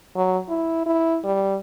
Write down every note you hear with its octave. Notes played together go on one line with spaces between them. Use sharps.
F#3
E4
E4
G3